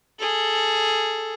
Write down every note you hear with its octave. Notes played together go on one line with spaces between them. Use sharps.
G#4 A4